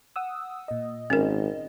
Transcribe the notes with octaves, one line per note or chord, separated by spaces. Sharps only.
F#5 D#6 E6
A#2 D#5
G#1 C#4 A#4